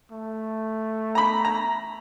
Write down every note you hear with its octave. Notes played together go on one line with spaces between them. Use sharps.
A3
A#5 B5
A#5